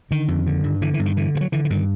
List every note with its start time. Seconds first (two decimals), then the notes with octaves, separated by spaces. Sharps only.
0.11 D3 D#3
0.28 F2
0.47 D3
0.64 G2
0.81 D3 E3
0.94 E3
0.99 G2
1.06 D#3
1.17 D3 E3
1.35 G2
1.41 F#3
1.52 D3 E3
1.65 E3
1.70 G2 D#3